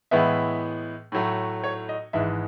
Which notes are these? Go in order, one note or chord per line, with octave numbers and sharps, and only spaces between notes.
A2 E3 G#3 B3 E5
A2 F#3 A3
C#5
D#5
G#1 G#2 E3 G#3 E5